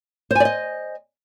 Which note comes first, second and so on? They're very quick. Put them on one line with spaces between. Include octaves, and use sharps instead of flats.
C5 G#5 D5 D#5